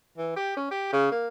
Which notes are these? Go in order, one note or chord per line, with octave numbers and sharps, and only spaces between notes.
E3
G4
C#4
G4
C#3
A#3